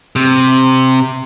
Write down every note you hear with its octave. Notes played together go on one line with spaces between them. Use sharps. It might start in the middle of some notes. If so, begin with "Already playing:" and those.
C3